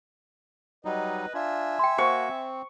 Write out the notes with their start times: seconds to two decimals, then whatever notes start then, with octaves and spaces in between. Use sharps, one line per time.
0.85 F#3 G3 D#4 B4 D#5
1.34 D4 F4 E5 G#5
1.79 G5 C6
1.98 A#3 F#4 C5 C#6
2.29 C4